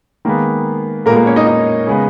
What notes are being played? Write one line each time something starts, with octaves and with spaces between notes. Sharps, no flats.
D#3 G#3 A#3 B3 A#4
A#2 G#3 A#3 B3 A#4
A#3 A#4
C#4 C#5
D#4 D#5
D#4 D#5
C#3 G#3 B3